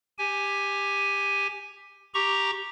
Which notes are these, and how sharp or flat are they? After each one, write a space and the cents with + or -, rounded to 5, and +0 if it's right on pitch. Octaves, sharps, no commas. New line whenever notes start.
G4 +15 G#5 +0
G4 +0 A#5 +0 C#6 +0